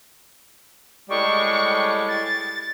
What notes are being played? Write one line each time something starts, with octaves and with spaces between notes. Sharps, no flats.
A2 G3 G#3 C#6
A6